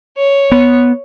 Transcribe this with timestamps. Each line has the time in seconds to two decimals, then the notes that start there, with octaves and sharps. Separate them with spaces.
0.17 C#5
0.52 B3